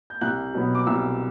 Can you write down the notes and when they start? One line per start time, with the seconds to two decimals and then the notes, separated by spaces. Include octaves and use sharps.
0.10 G6
0.21 C2 F#6
0.54 B2 F#3 B3
0.75 D6
0.86 C2 E6